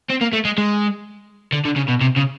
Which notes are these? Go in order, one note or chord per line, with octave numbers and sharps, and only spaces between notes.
C4
A#3
A3
G#3
G#3
D3
D3
C#3
B2
C3
C#3